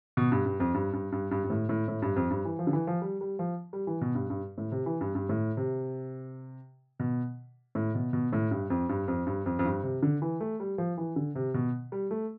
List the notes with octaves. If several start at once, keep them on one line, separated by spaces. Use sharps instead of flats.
B2
G2
G2
F2
G2
G2
G2
G2
G2
A2
A2
A2
G2
F2
G2
E3
F3
D3
E3
F3
G3
G3
F3
G3
E3
B2
G2
G2
A2
C3
E3
G2
G2
A2
C3
B2
A2
B2
B2
A2
G2
F2
G2
F2
G2
F2
F2
G2
C3
D3
E3
A3
G3
F3
E3
D3
C3
B2
G3
A3